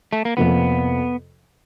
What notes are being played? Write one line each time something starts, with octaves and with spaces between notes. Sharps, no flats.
A3
A#3
F2 C3 F3 A#3 B3